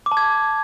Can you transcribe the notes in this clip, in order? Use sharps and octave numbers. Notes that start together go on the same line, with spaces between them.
D6
A5
G#6